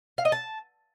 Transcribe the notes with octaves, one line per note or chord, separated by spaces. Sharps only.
F5
D#5
A5